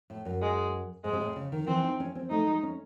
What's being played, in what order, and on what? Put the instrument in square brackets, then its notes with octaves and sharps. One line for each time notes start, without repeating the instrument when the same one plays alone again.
[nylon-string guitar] A2
F#2
[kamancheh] G#3
[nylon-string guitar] G#2 [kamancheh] G#3
[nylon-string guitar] C3
A2
C#3
D#3
[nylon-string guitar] E3 [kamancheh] C4
[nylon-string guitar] D#4
C#4
C4
[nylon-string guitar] A3 [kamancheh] D#4
[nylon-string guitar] G#3
C#4